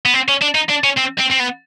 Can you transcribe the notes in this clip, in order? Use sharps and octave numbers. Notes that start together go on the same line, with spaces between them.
B3
C4
C#4
D4
D#4
D4
C#4
C4
C4
C4
B3